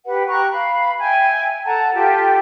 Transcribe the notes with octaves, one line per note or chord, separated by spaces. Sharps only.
G4 B4 F#5
G4 A#5 C#6 F#6
F5 B5
E5 G5 G#5
A4 F#5 A5 A#5
F4 G4 A4 G5